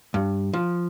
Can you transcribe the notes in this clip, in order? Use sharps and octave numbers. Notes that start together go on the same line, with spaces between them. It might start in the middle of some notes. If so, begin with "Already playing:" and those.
G2
F3